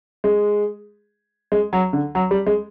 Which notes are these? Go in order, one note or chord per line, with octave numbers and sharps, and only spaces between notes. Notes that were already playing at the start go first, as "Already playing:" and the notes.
G#3
G#3
F#3
D3
F#3
G3
G#3